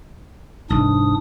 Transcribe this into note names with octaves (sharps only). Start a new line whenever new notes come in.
F1 C2 G#2 D4 D#6